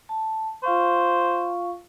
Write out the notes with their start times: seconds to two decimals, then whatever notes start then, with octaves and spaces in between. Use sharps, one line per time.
0.09 A5
0.63 F4 C5 F5 C#6